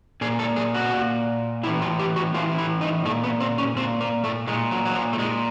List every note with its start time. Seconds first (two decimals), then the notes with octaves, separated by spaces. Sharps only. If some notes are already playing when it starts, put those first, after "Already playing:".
0.21 A#2 G#4
0.39 A4
0.56 G#4
0.74 F#4
0.93 A#2
1.64 A2 E4
1.67 E3
1.82 F4
1.99 G4
2.16 F#4
2.34 A2 E3 F4
2.58 E4
2.81 D#4
3.05 A#2 A3
3.24 B3
3.40 C4
3.58 C#4
3.76 A#2 C4
4.01 A#3
4.24 A3
4.47 A#2 G#3
4.71 F#3
4.86 F#3
4.95 F3
5.13 A3
5.19 A#2 G#3